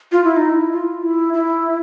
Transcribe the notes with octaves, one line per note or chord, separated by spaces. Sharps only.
F4
E4
D#4
E4
F4
E4
E4